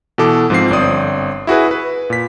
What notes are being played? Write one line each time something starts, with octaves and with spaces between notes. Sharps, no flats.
B2 E3 A4 D6
G#2 F3 C4 C7
G1 C4 C5 D5 D#6
E4 F#4 G#4 B4
B4
A#2 B6